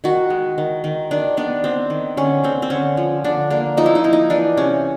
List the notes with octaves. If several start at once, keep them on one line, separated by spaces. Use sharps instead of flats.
D#3 F#4
G#3
D#3
D#3
D#3 D4
B3 D4
B3 C4
D#3
D3 C#4
D3 C4
C4
D3 C#4
F3
D3 D4
A#3 D4
F3 D#4
E4
D#4
A#3 E4
D#4
E3 D4
C3 C#4